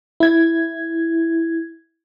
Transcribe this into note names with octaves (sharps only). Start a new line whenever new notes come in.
E4 G#6